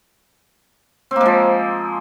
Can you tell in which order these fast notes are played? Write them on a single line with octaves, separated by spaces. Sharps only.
C4 A#3 G#3 F3